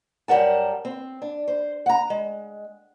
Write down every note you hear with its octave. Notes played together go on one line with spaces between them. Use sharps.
F#2 G3 A#4 F#5 A5
C4
D4
C5
F#5 A#5
G#3